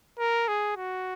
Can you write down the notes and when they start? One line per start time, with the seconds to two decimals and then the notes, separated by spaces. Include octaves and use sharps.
0.19 A#4
0.48 G#4
0.76 F#4